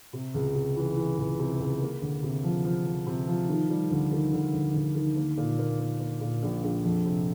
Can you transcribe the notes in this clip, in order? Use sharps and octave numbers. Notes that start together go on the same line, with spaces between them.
C3
C#2
C3
E3
E3
C#2
C3
C#2
A#3
D2
C3
F3
F3
F3
C3
F3
D#3
G3
D2
D#3
D2
D2
D2
D#3
A#3
A#2
A#3
A#3
A#3
A#2
A#1
A#1
F2
C3